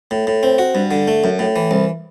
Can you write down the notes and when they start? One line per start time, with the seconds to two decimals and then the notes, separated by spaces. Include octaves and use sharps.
0.11 A2
0.27 A2
0.43 C4
0.58 F#4
0.75 G2
0.91 D3
1.08 A3
1.24 F#2
1.39 A2
1.56 E3
1.71 C2